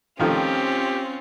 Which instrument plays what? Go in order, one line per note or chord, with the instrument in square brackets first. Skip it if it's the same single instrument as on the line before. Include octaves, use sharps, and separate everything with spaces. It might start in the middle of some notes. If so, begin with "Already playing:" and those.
[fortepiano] D#3 F3 A3 [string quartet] C4 C#4 F4 [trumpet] G4